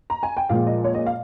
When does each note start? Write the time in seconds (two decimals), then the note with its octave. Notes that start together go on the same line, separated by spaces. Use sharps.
0.10 A#5
0.23 G#5
0.37 G5
0.49 A#2 F3 G#3 F5
0.67 D#5
0.84 C#5
0.94 D#5
1.06 F5